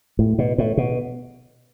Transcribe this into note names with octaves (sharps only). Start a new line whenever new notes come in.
A2
B2
A2
B2